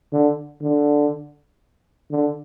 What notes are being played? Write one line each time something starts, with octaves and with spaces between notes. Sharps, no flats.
D3
D3
D3